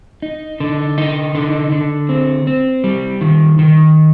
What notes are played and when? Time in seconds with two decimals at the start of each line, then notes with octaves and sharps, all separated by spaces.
0.22 D#4
0.60 D3
0.98 D#4
1.35 D3
1.72 D3
2.09 C4
2.47 C4
2.84 G3
3.21 D#3
3.59 D#3